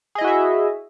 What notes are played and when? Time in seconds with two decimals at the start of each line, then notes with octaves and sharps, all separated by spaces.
0.15 G#4
0.18 D#5
0.21 E4
0.24 F#4
0.27 E5